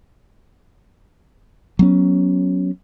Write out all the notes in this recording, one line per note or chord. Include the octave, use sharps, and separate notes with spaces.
F#3 B3 C#4